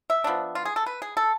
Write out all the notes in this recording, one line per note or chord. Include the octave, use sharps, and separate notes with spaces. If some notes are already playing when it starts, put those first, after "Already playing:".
E5
F3 B3 D4
F4
G#4
A4
B4
G#4
A4